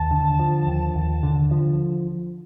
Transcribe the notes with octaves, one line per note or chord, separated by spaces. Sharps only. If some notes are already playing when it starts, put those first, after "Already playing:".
Already playing: D#2 A5
D3
F3
D#2
D#2
D3
F3